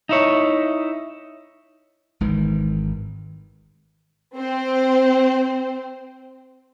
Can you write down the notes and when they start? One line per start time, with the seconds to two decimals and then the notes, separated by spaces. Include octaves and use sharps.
0.09 D#4 E4 C#5
2.20 G#1 G#2 D#3 E3
4.36 C4 C5